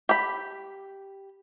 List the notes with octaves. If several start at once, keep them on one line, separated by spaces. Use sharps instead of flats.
G4 B5